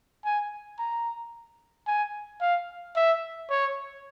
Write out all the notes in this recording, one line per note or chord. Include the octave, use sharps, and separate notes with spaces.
G#5
A#5
G#5
F5
E5
C#5